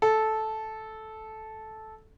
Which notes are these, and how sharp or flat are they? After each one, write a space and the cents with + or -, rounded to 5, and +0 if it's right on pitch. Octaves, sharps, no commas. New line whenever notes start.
A4 -10